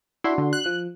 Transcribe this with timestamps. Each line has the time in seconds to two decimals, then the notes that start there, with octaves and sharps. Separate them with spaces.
0.24 D4 E4 F#4 C6
0.38 D3
0.53 F#6
0.66 F3